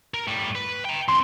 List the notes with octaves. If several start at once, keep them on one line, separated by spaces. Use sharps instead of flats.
A#4
A2 G3
B4
G5 A#5
E3 C4 C6